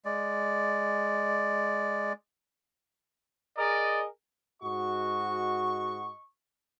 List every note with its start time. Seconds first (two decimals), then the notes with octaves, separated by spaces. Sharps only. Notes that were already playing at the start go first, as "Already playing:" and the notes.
0.05 G#3 D5
3.57 G#4 A#4 D5 D#5
4.63 G#2 F#4 D#5 C#6